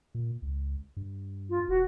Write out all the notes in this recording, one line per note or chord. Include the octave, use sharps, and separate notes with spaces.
A#2
C#2
G2
F4
E1 F#4